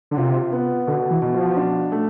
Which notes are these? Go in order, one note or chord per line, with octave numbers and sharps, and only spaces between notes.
D3
C3 F4
B3
B2 D3
E3
B2
F3
D4
A3